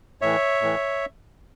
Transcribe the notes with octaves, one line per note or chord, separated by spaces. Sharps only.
A2 E3 C#5 E5
A2 E3